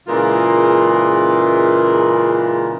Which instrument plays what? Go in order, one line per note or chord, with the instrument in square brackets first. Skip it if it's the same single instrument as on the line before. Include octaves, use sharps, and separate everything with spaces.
[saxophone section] A#2 C#3 E3 G#3 F4 A#4